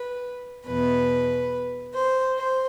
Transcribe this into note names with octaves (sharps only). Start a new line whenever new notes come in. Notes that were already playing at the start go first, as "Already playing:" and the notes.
Already playing: B4
E2 B2 B4
C5
C5